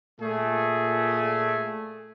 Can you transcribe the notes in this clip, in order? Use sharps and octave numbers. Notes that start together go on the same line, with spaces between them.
A#2 A3 G#4